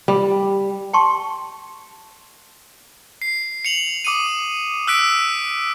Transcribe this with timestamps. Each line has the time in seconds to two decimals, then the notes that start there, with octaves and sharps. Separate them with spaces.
0.08 G3
0.93 G5 A5 C6 C#6
3.22 C7
3.65 C#7 F7 F#7
4.04 D6 D#6 C#7 D#7
4.87 E6 F#6 B6 D7